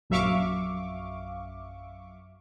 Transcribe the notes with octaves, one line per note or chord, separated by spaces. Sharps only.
A#1 F#2 E5 F5 C#6 D6